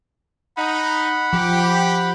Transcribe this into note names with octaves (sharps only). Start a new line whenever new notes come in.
D#4 F#5 B5
F3 G4